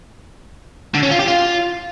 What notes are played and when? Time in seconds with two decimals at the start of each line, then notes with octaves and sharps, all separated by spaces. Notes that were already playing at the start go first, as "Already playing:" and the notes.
0.94 D3
1.03 C#4
1.11 F4
1.19 G4
1.27 F4